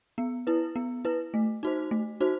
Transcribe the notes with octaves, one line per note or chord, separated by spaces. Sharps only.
B3
E4 B4
B3
E4 B4
A3
D#4 F#4 C5
A3
D#4 F#4 C5